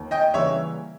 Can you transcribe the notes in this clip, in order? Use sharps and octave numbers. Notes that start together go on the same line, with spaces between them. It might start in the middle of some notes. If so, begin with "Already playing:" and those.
Already playing: D#2
D#5 G5
C#3 E3 G3 A#3 C#5 E5